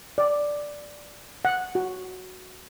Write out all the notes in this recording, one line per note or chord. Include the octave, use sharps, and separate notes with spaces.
D5
F#5
F#4